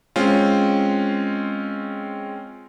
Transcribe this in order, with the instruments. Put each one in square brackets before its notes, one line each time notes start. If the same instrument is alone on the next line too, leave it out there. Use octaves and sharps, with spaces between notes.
[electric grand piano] G#3 C4 C#4 F4